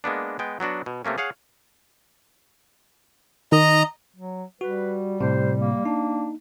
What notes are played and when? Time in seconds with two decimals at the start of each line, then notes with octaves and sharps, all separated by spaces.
0.04 G#3 A#3 B3 D4
0.39 G#3 B3 G5
0.60 F#3 B3 D4 F#4
0.86 B2
1.05 C3 A3 A#3 C#4
1.18 G#4 C#5 F5 F#5
3.52 D#3 D#5 A#5
4.16 F#3
4.61 G3 F#4 B4
5.21 A2 C3 C5
5.60 A#3
5.85 D4 D#4